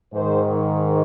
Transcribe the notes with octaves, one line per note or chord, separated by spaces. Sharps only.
G#2 D#3 C5